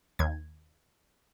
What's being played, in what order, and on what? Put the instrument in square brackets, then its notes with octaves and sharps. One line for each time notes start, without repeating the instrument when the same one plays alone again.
[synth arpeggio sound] D#2 G#6